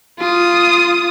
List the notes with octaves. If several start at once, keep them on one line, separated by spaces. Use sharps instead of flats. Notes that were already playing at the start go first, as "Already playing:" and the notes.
F4 D#6